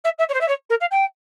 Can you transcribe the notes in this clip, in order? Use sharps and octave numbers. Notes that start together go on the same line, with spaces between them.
E5
E5
C#5
C5
E5
C#5
A#4
F5
G5